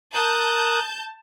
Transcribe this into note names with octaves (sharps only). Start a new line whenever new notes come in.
A#4 A5 D#6 F#6 G6